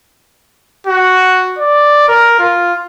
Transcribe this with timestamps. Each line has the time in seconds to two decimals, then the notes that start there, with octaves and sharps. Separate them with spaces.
0.87 F#4
1.58 D5
2.08 A#4
2.39 F4